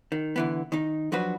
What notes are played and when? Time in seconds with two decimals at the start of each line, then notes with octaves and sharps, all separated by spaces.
0.12 D#3
0.36 D3 E3 B3
0.72 D#3 D#4
1.12 F3 F#3 D4 F#4 B4